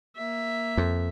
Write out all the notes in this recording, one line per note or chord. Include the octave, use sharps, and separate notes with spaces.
A#3 E5
F2